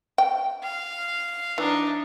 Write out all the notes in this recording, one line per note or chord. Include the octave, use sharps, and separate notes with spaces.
G5
F5
E3 D4 D#4